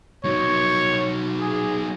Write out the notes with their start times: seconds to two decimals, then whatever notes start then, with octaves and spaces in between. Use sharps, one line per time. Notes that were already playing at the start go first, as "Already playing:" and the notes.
0.24 F#3 D#4 C#5
1.40 G#4